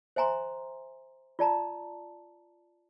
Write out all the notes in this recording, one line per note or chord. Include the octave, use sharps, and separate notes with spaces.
C5 E5 G#5 A#5 C6
F4 D5 A5 A#5